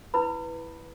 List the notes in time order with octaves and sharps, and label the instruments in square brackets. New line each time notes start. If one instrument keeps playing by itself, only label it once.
[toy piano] E4 B4 B5